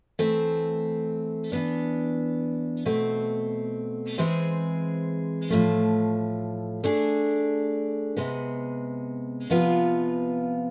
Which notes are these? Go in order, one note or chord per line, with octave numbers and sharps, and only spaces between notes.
E3 A3 C4
E3 B3 D4
B2 A3 C4
E3 G#3 C4 G#4 C5
A2 F3 A3
A3 D4 G#4
C3 G#3 B3
C3 F3 B3 F4 B4